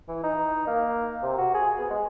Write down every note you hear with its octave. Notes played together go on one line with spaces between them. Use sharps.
E3
D#4
A#3
C3
F#4
G#4
B3
G#3